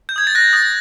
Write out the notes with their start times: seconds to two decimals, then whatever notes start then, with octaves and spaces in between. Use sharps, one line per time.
0.09 G6
0.16 D#6 G#6
0.27 A6
0.35 F#6 A#6
0.53 D#6 A6